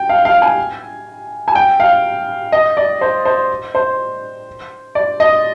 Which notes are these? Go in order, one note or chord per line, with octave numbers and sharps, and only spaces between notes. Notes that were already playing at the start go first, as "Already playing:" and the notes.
Already playing: G5
F5
F5
G#5
G#5
G5
F5
D#5
D5
C5
C5
C5
D5
D#5